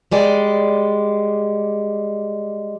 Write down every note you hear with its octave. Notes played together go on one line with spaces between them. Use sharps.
G3 G#3 D5